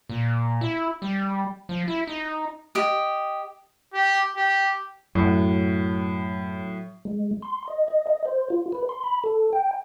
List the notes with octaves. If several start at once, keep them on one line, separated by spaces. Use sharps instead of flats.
A#2
E4
G3
F3
E4
D#4
G4 D#5
G4
G4
F#2 A2 F#3
G#3
C6
D#5
D#5
D#5
C5
F4
B4
C6
B5
A4
G5